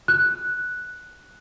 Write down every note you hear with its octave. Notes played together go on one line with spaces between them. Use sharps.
F#6